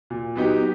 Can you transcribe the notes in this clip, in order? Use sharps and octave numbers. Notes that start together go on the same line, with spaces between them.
A#2
F#3 B3 D#4 G4